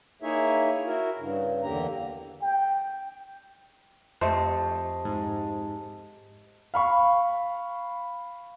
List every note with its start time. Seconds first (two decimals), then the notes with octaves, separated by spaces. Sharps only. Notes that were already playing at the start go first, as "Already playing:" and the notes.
0.22 A#3 D#4 E4 G#4 C#5 E5
0.86 E4 F#4 A#4
1.18 G2 C#3
1.63 E2 D3 A#3 G4 A#5
2.42 G5
4.21 F2 A3 G4 C5 D#5 A5
5.05 G#2
6.74 F5 B5 C#6